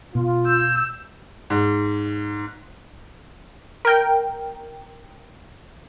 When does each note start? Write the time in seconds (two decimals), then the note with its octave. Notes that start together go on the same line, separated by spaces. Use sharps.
0.15 B2 F4
0.46 E6 G6
1.50 G#2
3.85 A#4 G5